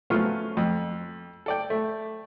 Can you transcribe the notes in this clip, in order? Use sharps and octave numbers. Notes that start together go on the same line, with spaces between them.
F3 F#3 A3 B3 C#4 F4
F2
A4 D5 G5
A3